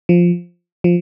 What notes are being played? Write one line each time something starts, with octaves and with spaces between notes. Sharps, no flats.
F3
F3